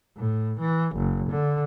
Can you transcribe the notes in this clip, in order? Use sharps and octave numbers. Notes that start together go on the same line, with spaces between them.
A2
E3
F#1
D3